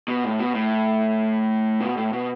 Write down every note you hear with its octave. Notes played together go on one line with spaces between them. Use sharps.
B2
A2
B2
A2
B2
A2
B2